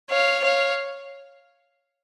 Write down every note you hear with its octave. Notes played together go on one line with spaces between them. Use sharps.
C#5 F5
C#5 F5